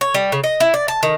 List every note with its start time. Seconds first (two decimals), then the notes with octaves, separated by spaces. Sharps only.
0.01 C#5
0.14 G3
0.32 C#3
0.44 D#5
0.60 E4
0.74 D5
0.88 A5
1.03 D#3